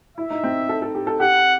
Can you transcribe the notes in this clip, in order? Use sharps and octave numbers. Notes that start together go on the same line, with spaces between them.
E4 E5
D#4
C4
A4
A4
G4
A4
G4 F#5